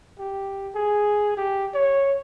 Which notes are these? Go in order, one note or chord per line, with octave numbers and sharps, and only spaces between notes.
G4
G#4
G4
C#5